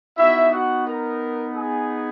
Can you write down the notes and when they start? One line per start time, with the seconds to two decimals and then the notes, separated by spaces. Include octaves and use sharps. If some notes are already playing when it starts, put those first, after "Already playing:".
0.17 B3 D#4 E4 F#4 E5
0.52 F#4 F#5
0.87 A#4 A#5
1.56 G#4 G#5